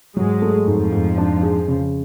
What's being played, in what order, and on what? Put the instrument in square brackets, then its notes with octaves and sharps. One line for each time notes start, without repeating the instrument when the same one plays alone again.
[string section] G#2 G#3 [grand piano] F#3
[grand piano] A3
[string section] F2 F3 [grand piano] G#2
[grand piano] G#2
D4
G#4
C#3